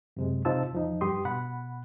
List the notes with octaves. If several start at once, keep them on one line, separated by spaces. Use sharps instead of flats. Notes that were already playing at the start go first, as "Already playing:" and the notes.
F#2 C3 G#3
C3 D#4 F4 C5 A5 E6
E2 F3 D#4
G2 G4 C6 D#6
B2 F#5 B5